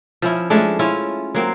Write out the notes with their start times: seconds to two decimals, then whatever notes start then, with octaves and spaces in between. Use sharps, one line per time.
0.22 F3 C#4 E4
0.50 G#3 A3 C#4 D4
0.79 C#4 E4 F4
1.35 F#3 A#3 C4